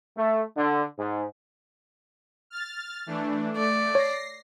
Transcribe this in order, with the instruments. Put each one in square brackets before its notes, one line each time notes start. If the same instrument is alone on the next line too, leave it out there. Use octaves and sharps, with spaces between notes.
[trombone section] A3
D3
G#2
[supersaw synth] F6 A6
E3 A3 D4
[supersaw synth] A3 [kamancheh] D5
[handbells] C#5 [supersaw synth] A#6 C7